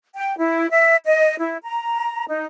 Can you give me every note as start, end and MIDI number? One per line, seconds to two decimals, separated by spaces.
0.16 0.35 79
0.37 0.69 64
0.70 0.96 76
1.04 1.35 75
1.38 1.58 64
1.63 2.25 82
2.28 2.45 63